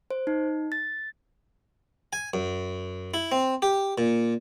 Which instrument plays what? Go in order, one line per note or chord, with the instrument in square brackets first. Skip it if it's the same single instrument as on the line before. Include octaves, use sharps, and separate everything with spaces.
[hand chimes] C5
D#4
A6
[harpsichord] G#5
F#2
E4
C4
G4
A#2